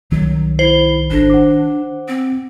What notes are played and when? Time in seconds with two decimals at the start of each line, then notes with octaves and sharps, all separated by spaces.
0.12 C2 D#3 F#3
0.59 E4 C5
1.11 G#1 D4 A4 A#6
1.30 F#5 D6
2.08 C4